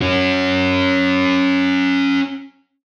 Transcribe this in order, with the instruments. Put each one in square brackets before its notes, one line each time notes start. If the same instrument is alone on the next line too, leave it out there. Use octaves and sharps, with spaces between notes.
[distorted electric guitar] C#4 F#4